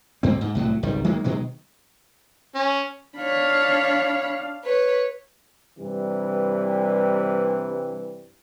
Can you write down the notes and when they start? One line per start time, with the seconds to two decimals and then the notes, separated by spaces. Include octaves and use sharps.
0.23 D2 G2 C4
0.41 G#2
0.55 C2 A2 F#3
0.83 G#1 C#2 D#3 G3
1.04 D#3 F#3 G#3 A#3
1.24 B2 D#3 F#3 G#3
2.55 C#4
3.18 D4 C#5 F5 B5
4.64 B4 C#5
5.79 G2 C3 E3 G3